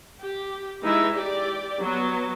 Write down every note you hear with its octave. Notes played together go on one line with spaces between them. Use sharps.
G4
E3 G#3 D#4 E4 E5
G4 D5
F#3 B3